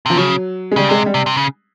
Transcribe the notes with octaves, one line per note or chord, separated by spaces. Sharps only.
C3 F3
C#3 F#3
G#3
C#3 G3
C3 G#3
G3
C3
C3
C#3